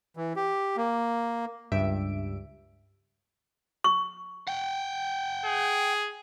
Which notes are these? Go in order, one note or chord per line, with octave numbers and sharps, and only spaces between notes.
E3
G4
A#3
C#2 G2 G4 E5 D7
C#6
F#5 G5
G#4